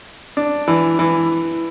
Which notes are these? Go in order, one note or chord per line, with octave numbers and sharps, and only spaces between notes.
D4
E3
E3